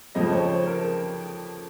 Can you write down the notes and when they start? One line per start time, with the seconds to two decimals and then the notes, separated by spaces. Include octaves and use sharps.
0.15 F2 C#3 F3 D#5
0.26 C5
0.32 C#5
0.49 C5
0.67 A#4